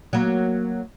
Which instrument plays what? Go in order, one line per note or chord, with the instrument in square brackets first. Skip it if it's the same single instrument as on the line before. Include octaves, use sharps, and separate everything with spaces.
[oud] F#3 A#3